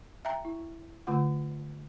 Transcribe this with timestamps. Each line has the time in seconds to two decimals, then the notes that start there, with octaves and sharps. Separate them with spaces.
0.25 E5 G5 A#5
0.45 E4
1.07 D3 A3 F4 F#5